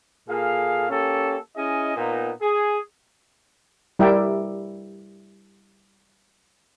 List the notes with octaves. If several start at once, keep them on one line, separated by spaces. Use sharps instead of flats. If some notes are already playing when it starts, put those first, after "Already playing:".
A#2 G#4 A4 F5
A#3 C#4 G4 A4
C#4 E4 G#4 D#5
A#2 B3 D#4
G#4
G3 E4 A#4 D5 E5 G5